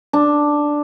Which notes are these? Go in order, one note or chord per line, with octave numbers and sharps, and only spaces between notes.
D4